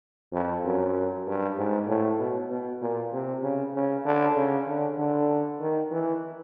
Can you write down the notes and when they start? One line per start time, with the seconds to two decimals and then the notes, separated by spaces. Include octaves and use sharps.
0.33 F2
0.65 F#2
1.27 G2
1.58 G#2
1.88 A2
2.19 B2
2.50 B2
2.82 A#2
3.13 C3
3.43 C#3
3.74 C#3
4.05 D3
4.37 C#3
4.68 D3
4.98 D3
5.60 D#3
5.91 E3